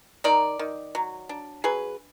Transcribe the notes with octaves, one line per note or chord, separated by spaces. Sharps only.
D#3 A#4 D5
D#3
F#3
D4
F#3 G#4 B4